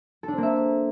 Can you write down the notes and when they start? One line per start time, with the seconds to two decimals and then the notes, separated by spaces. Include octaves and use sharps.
0.23 A4
0.28 D4
0.33 C4
0.38 A#3
0.43 E5